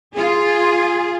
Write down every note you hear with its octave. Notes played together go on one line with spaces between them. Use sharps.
F4 G#4